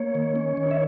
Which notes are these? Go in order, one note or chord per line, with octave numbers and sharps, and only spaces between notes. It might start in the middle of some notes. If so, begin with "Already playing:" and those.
Already playing: A#3 C#5
D#3
C#4
D#3
E5